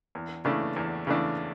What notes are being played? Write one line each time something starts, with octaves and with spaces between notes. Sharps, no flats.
E2
C#3 E3 A3 D4
E2
C#3 E3 A3 D4